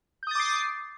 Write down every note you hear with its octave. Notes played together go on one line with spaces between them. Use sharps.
D6 D#6 G6 A6 C7